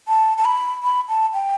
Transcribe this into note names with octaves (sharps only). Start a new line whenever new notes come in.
A5
A5
B5
B5
A5
G5